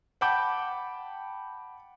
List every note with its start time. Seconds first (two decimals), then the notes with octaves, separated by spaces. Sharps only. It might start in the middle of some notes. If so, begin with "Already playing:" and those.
0.21 F#5 G5 A5 B5 D6 G6